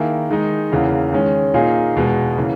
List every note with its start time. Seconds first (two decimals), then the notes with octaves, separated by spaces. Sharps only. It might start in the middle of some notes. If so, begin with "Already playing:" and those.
Already playing: D#3 A#3 E4 G#4
0.30 D#3 G#3 D#4
0.72 E2 C#3 E3 A#3
1.12 D#3 G#3 C#4
1.54 A#2 A#3 D#4 G#4
1.95 E2 B2 G#3 B3
2.36 C#3 E3 A#3